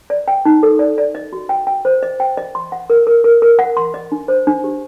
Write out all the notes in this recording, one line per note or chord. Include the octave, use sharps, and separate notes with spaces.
D5
G5
D#4
A4
D5
D5
D#5
F#4
G5
G5
C5
D#5
G5
D#5
C6
F#5
A#4
A#4
A#4
A#4
F#5
C6
D#5
D4
C5
D4
G4